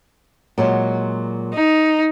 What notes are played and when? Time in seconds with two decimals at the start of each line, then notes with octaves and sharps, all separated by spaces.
0.58 A#2 F#3 G#3
1.54 D#4